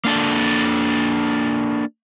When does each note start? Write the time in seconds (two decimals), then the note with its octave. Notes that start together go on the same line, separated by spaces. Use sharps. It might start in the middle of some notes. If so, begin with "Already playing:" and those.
0.05 A#3 D4 A4